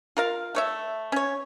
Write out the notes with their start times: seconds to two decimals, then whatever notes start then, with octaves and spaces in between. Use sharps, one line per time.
0.17 F4 A#4 F5
0.55 A3 C#5 E5
1.12 C#4 C#5